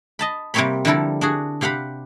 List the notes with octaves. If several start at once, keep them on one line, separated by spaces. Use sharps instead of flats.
D#5 A5 B5
C3 G3 A#3 C4 C#5 B5
D3 F3 G3 E4 A4 A#4
D4 F#4 G#4
C3 G4 F5 F#5 B5